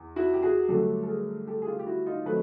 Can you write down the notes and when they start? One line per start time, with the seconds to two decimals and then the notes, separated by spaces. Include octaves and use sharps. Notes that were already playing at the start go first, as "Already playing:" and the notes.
Already playing: E2
0.16 E4 F#4
0.33 G4
0.43 F#4 G#4
0.69 G2 D3 F#3 A3 G4 A4
1.03 A4
1.08 G#4 A#4
1.47 G4 A4
1.62 G#4
1.67 F4 G4
1.79 G4
1.86 E4 F#4
2.06 D#4 F4
2.25 D#3 F#3 A3 C4 A4 B4